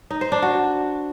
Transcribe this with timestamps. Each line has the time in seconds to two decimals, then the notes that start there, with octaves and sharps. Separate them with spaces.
0.10 D#4
0.21 C5
0.32 D4
0.42 F#4